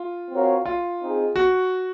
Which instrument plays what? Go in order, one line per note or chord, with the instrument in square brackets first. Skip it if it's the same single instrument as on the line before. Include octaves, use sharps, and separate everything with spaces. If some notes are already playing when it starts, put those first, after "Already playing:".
Already playing: [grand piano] F4
[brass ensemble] C4 F#4 A#4 C#5 F5
[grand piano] F4
[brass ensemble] C4 D#4 G#4 D#5
[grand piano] F#4